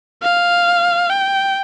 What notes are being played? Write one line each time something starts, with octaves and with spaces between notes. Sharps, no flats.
F5
G5